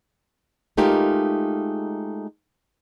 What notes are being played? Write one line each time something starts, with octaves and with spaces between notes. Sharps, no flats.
G#3 A3 D#4 F4 G4 A#4